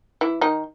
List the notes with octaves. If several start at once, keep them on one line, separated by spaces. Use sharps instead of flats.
E3 E4
D#3 D#4